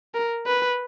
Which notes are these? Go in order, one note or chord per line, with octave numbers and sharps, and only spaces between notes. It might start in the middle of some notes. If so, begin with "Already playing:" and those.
A#4
B4